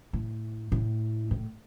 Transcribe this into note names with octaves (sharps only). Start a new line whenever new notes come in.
A2
A2
A2